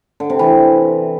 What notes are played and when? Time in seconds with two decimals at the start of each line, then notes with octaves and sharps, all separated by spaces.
0.20 D3
0.30 C3
0.39 E3